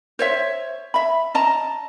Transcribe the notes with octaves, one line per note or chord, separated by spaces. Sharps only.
C5 C#5 E5
E5 B5
D#5 A5 A#5